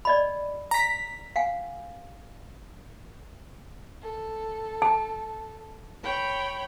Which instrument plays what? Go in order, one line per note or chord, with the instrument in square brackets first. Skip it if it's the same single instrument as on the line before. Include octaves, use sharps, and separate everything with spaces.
[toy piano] D5 D#5 B5
[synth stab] A#5 B6
[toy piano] F5 F#5 G#5
[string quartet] A4
[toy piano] A5
[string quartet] C#5 G5 B5